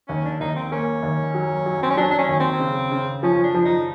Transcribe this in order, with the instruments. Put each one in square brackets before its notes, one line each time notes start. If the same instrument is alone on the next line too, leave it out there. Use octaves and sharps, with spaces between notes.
[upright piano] D#2 [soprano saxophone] C#4
[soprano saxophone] D4
[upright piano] D#2 [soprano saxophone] D#4
[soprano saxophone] C4
[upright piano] A#3 [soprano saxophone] C#4
[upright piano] D#2
F#3
F#3
[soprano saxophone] C4
C#4
[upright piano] F#3 [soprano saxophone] D4
[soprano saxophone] D4
C#4
[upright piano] D#2
[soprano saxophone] C4
[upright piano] C#3
C#3
[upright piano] F3 [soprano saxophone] C#4
[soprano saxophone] D4
[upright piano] F3
[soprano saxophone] D#4